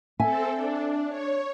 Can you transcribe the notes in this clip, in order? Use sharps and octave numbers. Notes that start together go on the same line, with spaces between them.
C4 A4 E5 G#5
D4
C#5